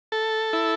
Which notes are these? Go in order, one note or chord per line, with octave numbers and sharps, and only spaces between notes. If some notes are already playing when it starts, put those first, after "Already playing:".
A4
E4